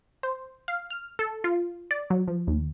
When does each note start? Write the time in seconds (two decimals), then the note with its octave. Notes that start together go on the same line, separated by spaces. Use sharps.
0.23 C5
0.68 F5
0.90 F6
1.19 A4
1.44 F4
1.91 D5
2.10 F#3
2.28 F3
2.47 D#2